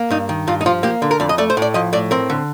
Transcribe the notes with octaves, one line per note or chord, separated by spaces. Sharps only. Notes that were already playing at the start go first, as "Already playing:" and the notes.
Already playing: A#3
G2 D#4
D#3
G2 F4
D#4
F3 F4
A#3 G4
D3
A#4
F2 D5
D#5
A3 D5
C5
A2 D5
F3 D#5
A2 D5
C4 A#4
D3